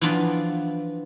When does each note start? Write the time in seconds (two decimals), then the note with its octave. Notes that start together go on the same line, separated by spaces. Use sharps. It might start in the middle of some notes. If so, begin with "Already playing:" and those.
0.01 E3 F3 B3 D4 F4